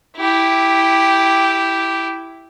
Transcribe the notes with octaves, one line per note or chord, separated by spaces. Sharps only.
E4 G4